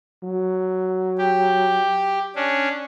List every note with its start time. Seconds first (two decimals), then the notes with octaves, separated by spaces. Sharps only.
0.23 F#3
1.18 G4
2.36 C#4 D4